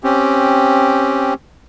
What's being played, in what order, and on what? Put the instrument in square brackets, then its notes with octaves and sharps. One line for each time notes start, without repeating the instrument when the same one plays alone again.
[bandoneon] C4 C#4 G4